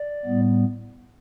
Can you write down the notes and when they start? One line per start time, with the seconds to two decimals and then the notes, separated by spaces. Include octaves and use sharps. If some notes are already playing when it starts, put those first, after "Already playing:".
Already playing: D5
0.25 A2 G3 B3